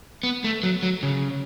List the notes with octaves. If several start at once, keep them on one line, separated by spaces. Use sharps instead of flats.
B3
A3
F#3
F#3
C#3